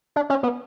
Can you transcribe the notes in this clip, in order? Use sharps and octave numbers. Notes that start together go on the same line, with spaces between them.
D4
C#4
B3